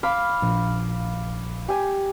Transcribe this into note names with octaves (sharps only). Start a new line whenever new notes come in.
F5 B5 D6
A#1
G4 G#5